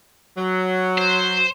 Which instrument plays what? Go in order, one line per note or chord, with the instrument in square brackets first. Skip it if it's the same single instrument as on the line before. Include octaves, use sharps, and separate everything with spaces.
[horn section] F#3
[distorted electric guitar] C5